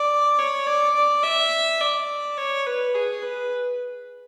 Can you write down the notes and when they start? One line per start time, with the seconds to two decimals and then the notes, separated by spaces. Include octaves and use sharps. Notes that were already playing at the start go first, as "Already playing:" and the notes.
Already playing: D5
0.39 C#5
0.67 D5
0.95 D5
1.24 E5
1.81 D5
2.37 C#5
2.66 B4
2.95 G#4
3.23 B4